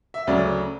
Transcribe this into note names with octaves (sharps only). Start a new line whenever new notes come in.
E5
D2 C#3 F#3 D5